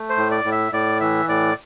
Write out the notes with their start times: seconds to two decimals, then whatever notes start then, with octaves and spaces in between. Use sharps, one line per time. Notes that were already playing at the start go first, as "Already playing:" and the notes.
Already playing: A3
0.10 C5
0.17 A2
0.31 D5
0.44 A2
0.52 E5
0.72 A2 D5
1.00 E3 E5
1.29 A2 D5